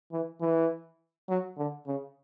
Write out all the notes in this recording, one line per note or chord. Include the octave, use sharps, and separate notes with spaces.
E3
E3
F#3
D3
C#3